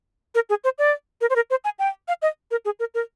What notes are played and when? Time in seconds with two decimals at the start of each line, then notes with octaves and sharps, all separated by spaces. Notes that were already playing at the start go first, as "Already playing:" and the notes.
0.35 A#4
0.50 G#4
0.64 C5
0.78 D5
1.21 A#4
1.30 C5
1.36 A#4
1.50 C5
1.64 G#5
1.79 G5
2.08 F5
2.22 D#5
2.51 A#4
2.65 G#4
2.80 A#4
2.94 A#4